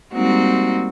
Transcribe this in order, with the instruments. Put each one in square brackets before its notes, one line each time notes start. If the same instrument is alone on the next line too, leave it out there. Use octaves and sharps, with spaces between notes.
[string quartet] G3 G#3 A#3 C4 D#4 F#4